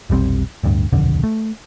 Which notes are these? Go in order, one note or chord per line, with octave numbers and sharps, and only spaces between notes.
F1 B1 G3 C4
D1 D2 G2
D#1 B1 F2 D3
A3